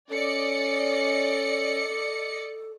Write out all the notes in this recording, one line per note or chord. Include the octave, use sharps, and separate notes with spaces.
C#4 A4 D5 D#5 C#7